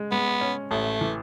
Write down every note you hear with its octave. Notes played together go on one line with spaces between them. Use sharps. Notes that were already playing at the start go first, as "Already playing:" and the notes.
Already playing: G#3
G#3 B3
C#4
A1 A3
E3